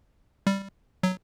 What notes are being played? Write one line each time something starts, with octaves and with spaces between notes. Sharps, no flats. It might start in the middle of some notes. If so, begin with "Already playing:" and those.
G3
F#3